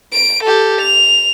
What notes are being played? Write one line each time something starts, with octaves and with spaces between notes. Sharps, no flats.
D7
G4 A4
F7